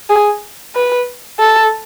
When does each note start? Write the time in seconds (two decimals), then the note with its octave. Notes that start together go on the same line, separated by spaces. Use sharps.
0.10 G#4
0.75 B4
1.39 A4